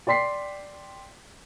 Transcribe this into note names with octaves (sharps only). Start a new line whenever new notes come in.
D5 G5 C6 B6 C7